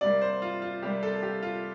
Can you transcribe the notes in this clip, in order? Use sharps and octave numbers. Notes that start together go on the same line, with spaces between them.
C3 G3 A#3 D5
C5
F4
F4
C3 G3 A#3 G4
A4
G4
F4